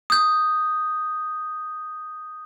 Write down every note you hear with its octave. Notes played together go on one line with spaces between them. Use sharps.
D#6 G6